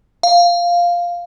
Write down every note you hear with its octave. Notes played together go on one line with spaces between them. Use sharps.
F5